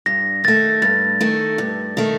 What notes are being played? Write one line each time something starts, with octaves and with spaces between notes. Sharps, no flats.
G2 A#6
D#3 A3 A6
G2 A6
D#3 A3
G2
D#3 A3